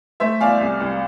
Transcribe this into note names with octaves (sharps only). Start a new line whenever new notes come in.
A3 C5 E5
E2 D5 F5
C2
C2